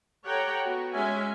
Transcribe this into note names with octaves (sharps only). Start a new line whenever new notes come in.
G4 A4 C#5 F#5 G5 A#5
B3 F#4
G#3 C#4 E5 G#5